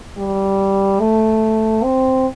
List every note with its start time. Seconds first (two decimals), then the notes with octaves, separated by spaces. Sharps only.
0.17 G3
1.00 A3
1.83 C4